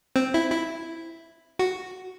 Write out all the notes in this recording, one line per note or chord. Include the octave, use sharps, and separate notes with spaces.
C4
E4
E4
F#4